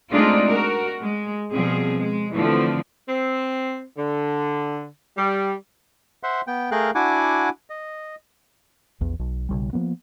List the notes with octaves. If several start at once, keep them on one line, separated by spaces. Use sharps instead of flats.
G#3 A3 C4 D4 D#4 F4
F#4 A#4
G#3
B2 F3 G3 C4 G#4
G#3
D3 E3 F3 A3 C4
C4
D3
G3
C5 E5 F#5 C6
B3 G5
A3 G#4 A#4 F5 G5 F#6
D4 E4 F#4 F#5 G#5 D6
D#5
A#1 E2
B1
B1 C#3 G3
F3 F#3 A#3 B3